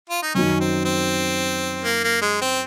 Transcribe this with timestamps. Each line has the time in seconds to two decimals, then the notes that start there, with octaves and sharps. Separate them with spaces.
0.10 F4
0.22 D#4
0.35 F#2 D#3 F#3 C#4
0.60 C4
0.85 C4
1.84 A#3
2.04 A#3
2.22 G#3
2.41 C4